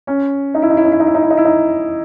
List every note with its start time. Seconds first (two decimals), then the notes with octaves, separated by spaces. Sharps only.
0.07 C#4
0.54 D#4
0.62 E4
0.70 D#4
0.77 E4
0.85 D#4
0.92 E4
1.00 D#4
1.07 E4
1.15 D#4
1.23 E4
1.30 D#4
1.37 E4
1.45 D#4